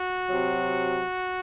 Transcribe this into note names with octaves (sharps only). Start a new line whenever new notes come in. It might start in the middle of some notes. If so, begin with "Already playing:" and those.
Already playing: F#4
C3 F#3